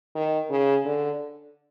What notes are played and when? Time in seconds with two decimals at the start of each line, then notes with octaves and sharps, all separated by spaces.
0.15 D#3
0.50 C#3
0.85 D3